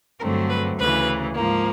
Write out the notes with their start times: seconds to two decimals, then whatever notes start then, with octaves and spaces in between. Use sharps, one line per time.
0.20 G2 D3 F#3 A3 C4 A#4
0.49 B4
0.78 D2 C#3 E3 B4
1.36 G#2 F3 A#3